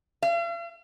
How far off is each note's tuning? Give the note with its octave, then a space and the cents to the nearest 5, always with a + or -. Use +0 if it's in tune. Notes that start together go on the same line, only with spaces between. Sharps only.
F5 -45